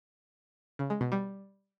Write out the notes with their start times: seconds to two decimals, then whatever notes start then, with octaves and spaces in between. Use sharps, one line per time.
0.79 C#3
0.90 G#3
1.01 B2
1.12 G3